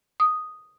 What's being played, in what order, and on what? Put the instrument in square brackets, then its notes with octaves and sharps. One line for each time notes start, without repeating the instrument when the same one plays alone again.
[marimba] D#6